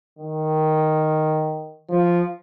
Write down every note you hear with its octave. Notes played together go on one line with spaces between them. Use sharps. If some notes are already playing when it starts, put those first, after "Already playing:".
D#3
F3